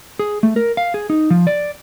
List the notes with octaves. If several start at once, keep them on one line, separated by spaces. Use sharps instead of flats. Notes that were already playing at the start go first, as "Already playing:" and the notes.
G#4
A3
A#4
F5
G#4
D#4
F3
D5